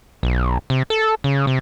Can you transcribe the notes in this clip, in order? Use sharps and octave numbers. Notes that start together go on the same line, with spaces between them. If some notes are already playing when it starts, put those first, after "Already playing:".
B1
C3
A4
C#3
C3